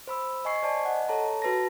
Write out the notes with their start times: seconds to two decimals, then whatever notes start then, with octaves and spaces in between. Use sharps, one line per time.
0.07 C5 B5 E6
0.45 D#5 G#5 C#6 C7
0.63 C5 D5 G#5 A5
0.85 D#5 F#5
1.09 A4 C#5 A5 A#5
1.42 F#4 B4 A5 A#6